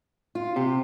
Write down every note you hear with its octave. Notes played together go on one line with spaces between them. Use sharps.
F4
C3 G4